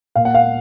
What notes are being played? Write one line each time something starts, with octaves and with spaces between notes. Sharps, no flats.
A#2 F5
F#5
F5